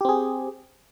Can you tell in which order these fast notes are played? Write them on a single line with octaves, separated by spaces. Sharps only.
G4 C4 G#4